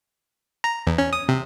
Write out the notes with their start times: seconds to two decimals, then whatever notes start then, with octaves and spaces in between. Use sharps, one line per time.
0.64 A#5
0.87 E2
0.98 C#4
1.13 D#6
1.29 C3